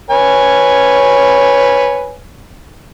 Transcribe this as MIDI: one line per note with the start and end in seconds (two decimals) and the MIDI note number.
0.10 2.15 71
0.10 2.15 73
0.10 2.15 80